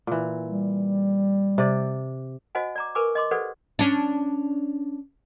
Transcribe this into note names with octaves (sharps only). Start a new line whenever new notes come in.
A#2 E3
G3
C3 D5
F#4 C5 D#5 F#5 G#5
D5 A#5 D6
A#4 B4 G#5 C#6 D6
D#5 C6 D6
G4 A4 B4 C5 D5 F#5
C#4 D4